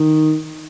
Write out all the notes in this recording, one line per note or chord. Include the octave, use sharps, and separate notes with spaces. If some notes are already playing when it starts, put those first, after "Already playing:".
Already playing: D#3